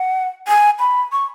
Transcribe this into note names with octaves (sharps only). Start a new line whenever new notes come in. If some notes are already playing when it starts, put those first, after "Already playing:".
Already playing: F#5
G#5
B5
C#6